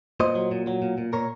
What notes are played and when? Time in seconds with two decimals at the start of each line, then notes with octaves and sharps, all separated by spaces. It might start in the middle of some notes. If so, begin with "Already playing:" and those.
0.20 A#2 C5 D#5
0.35 F#3
0.51 A#2
0.67 F#3
0.82 A#2
0.98 A#2
1.13 A#2 A#4 C#5